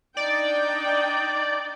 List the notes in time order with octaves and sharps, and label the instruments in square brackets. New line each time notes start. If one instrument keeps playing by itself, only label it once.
[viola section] D4 D#4 G5 [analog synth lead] D5